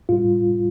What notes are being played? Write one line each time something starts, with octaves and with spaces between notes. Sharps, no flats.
A2 G3 F4